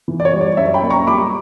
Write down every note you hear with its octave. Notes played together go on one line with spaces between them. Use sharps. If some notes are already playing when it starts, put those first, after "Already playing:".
E3
D5
C#5
G3
D5
F#2 C#5 E5
G5 B5
A#3
A#5 C#6
G3 B5 D6